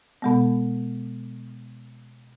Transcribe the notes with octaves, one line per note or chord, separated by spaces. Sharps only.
B2 G#3 B3